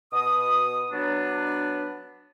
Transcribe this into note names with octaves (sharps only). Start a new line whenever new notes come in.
B2 D#6
F#3 B3 D4